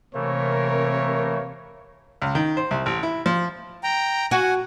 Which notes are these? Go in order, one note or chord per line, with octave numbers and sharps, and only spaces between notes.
C3 E3 A3 A#3 C4 A#4 C#5
C#2
D#3
C5
C2
A1
E4
F3
G5 A#5
F#4 F#5 G#5